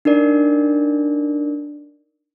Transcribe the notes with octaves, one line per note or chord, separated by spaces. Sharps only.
D4 D#4 A#4 D5